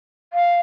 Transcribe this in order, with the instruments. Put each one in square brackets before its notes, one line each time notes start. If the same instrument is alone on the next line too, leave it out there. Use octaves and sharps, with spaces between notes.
[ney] F5